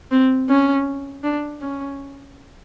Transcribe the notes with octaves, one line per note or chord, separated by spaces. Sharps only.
C4
C#4
D4
C#4